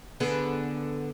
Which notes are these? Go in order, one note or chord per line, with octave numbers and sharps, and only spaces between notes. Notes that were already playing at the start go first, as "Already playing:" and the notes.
D3 B3 G#4